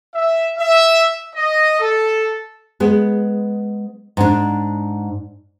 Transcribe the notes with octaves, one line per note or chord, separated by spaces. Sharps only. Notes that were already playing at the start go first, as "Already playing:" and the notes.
E5
E5
D#5
A4
G#3 B3
G#2 D4